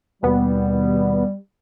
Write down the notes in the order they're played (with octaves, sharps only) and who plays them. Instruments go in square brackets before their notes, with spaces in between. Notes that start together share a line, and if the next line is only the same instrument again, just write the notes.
[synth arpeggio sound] D#2 B2 B3 [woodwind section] G3